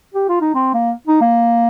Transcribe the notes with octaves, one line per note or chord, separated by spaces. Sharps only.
G4
F4
D#4
C4
A#3
D#4
A#3